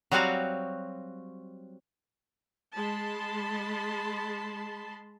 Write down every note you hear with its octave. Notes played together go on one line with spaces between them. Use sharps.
F#3 G3 C4 F#4 F5
G#3 A5 B5 C6